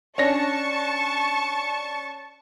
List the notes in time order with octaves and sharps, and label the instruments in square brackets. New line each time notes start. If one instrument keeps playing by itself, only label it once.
[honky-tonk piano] C#4 D4 A#6 [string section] A5 C#6